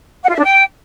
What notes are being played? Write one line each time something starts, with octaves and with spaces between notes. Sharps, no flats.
F#5
F4
E5
D4
G5